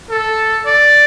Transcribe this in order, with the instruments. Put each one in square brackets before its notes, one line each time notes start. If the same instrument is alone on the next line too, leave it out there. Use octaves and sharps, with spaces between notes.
[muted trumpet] A4
D5